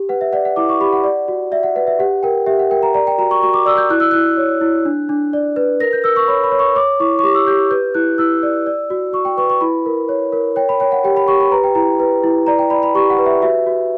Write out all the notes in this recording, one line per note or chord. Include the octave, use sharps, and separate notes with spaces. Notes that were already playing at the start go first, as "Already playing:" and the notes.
Already playing: G4
B4 F#5
E5
D5 F#5
F#5
E4 D6
C#6
G4 B5
F#5
D5
F#4
D5 E5
F#5
B4 F#5
E5
G4 F#5
A#4 G5
G4 E5
F#5
A#4 G5
A#5
D5 A#5
G5
F#4 A#5
C#6
F#4 C#6
D6
D5 E6
G6
E4 F#6
E6
E4 F#6
C#5
E4
D4
D4
D5
B4
A#4 A#6
G6
A#4 E6
C#6
C#5 B5
B5
C#5
C#6
C#5 D6
E4 C#6
C#6
G4 D6
E6
G4 G6
B4 G6
E4 F#6
E4 E6
D5
D5
F#4
F#4 C#6
G5
B4 C#6
C#6
E4 B5
A#4
C#5
A#4
C#5 G5
B5
C#5 G5
F#5
G4 G5
B5
G4 C#6
B5
B4 A#5
G5
E4 A#5
B4
E4
D5 A#5
G5
D5 B5
B5
G4 C#6
F#5
B4
E5
F#4 E5
F#4